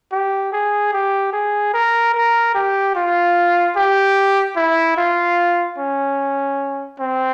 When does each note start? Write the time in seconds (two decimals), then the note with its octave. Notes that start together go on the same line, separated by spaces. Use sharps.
0.12 G4
0.52 G#4
0.93 G4
1.33 G#4
1.74 A#4
2.14 A#4
2.54 G4
2.95 F4
3.76 G4
4.56 E4
4.97 F4
5.78 C#4
6.99 C4